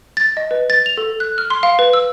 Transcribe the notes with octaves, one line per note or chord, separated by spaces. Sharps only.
A6
D#5
B4
A6
F7
A4
F#6
F6
C6
F5
B4
E6